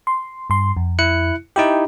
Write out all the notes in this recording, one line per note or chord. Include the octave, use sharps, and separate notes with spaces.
C6
G2 C6
F2
E4 F#6 C#7
D#4 E4 G4 G5